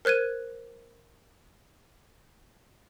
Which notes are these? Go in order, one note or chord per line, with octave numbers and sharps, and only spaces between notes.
A#4 C5 F#6 G#6 D#7